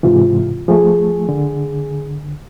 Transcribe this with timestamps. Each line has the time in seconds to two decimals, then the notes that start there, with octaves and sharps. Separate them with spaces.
0.03 G#2 C3 E3 F4
0.68 F3 A3 G#4
1.29 D3